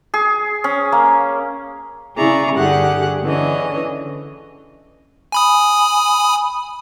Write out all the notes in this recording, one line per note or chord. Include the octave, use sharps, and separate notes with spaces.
G#4
C#4
A#3
C#3 E4 G#4 D5 A#5 C#6
G2 D3 G4 G#4 F#5 F#6
D3 E3 C#4 D#5
G#5 B5 D#6